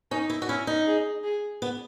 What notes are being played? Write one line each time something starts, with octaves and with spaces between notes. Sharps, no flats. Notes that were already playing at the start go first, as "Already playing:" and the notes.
C#4 D#4
E4
F#4
C#4 E4
D#4
G#4
G#4
B3